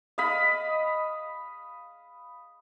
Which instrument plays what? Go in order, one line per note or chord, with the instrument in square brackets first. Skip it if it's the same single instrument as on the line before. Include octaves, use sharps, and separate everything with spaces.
[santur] D#5 F5 B5